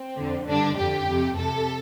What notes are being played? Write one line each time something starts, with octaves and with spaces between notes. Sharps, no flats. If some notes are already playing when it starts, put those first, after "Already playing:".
Already playing: C4
F2 D3
G2 D3 D4
F2 D3 G4
F2 C3
F2 C3 A4